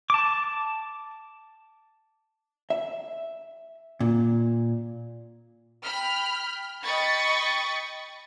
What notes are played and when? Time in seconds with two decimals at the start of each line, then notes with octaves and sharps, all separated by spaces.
0.10 A5 D6
2.70 E5
4.00 A#2
5.82 G5 B5 F6
6.83 D#5 G5 B5 C#6 A6 C#7